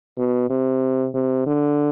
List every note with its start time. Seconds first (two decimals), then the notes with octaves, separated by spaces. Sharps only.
0.18 B2
0.50 C3
1.14 C3
1.46 D3